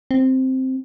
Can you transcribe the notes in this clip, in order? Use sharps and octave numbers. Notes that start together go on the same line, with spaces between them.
C4